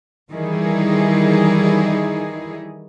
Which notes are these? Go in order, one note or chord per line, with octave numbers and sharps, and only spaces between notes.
D#3 E3 G3 D#4 E4 G#4